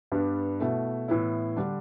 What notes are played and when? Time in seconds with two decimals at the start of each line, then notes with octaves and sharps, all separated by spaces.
0.12 G2 G3 B3 D4
0.60 B2 A3 E4
1.08 A2 E3 B3 E4
1.57 D3 G3 D4